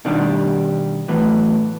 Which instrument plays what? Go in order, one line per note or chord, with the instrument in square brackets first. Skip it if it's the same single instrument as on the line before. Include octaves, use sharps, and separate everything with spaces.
[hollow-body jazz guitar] B2 D#3 G3 D4 G4
A2 E3 F#3 B3